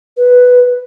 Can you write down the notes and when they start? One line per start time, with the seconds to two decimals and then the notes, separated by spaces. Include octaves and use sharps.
0.17 B4